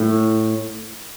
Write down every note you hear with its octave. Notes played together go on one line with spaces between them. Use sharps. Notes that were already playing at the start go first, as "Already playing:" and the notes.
Already playing: A2